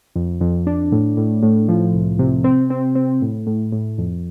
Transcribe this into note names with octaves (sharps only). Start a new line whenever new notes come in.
F2
F2
D4
A2
A2
A2
F3
C2
C3
C4
C4
C4
A2
A2
A2
F2